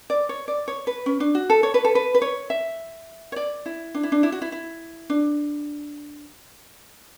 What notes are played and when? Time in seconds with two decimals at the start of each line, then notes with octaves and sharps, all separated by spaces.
0.10 D5
0.29 C#5
0.48 D5
0.68 C#5
0.87 B4
1.06 C#4
1.20 D4
1.35 F#4
1.50 A4
1.63 C#5
1.74 B4
1.85 A4
1.95 B4
2.15 B4
2.22 C#5
2.50 E5
3.32 C#5
3.36 D5
3.66 E4
3.95 D4
4.03 E4
4.12 D4
4.23 E4
4.32 F#4
4.42 E4
4.52 E4
5.10 D4